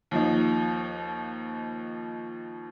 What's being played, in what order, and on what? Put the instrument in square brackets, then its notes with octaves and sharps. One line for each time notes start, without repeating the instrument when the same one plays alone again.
[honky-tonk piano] D#2 F3 D#4